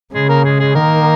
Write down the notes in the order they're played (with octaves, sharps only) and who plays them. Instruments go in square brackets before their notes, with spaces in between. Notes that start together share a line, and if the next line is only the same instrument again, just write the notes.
[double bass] C#3 [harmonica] G#3 G#4
[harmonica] A#3 A#4
G#3 G#4
G#3 G#4
[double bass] D#3 [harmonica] A#3 A#4